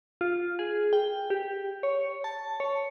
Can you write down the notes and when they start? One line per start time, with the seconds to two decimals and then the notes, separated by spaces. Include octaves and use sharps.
0.21 F4
0.59 G#4
0.93 G5
1.30 G4
1.83 C#5
2.24 A5
2.60 C#5